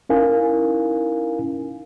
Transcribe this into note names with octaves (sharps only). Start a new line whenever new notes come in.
C#4 D#4 E4 A#4 F5 G#5